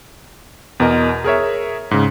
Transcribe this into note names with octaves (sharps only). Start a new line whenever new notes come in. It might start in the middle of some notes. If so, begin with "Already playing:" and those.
E2 B2 A#4 D#5
G#4 A#4 C#5 E5
G#2 C#3